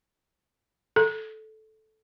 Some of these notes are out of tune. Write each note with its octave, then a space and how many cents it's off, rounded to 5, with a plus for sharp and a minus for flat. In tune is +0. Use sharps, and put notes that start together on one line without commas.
A4 -10